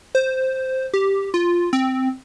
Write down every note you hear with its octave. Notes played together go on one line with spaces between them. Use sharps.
C5
G4
F4
C4